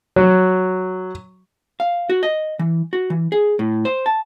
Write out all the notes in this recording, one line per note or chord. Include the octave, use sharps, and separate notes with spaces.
F#3
F5
F#4
D#5
E3
F#4
E3
G#4
A2
C5
A5